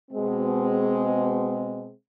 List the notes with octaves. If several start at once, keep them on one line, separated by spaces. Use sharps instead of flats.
B2 G#3 C4